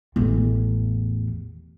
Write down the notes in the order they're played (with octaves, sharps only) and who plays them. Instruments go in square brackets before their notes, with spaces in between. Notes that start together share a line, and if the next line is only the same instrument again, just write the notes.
[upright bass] A1 E2